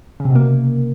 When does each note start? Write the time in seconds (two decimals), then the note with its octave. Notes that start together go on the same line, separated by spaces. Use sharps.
0.20 C#3
0.25 C3
0.30 B2
0.35 A#3